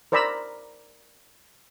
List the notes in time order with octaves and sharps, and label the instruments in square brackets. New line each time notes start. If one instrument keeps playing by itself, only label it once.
[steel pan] A#4 C5 D5 A#5 B5 E6